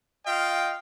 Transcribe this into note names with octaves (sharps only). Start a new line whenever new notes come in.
F4 D#5 F5 G5